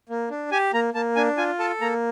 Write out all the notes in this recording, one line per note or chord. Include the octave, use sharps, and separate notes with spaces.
A#3
D4
G4 G#5
A#3 A#5
A#3 A5
D4 G#5
F4 G#5
A4 A5
A#3 A#5